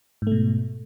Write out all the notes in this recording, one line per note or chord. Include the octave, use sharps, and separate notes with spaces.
G#2 B2 A3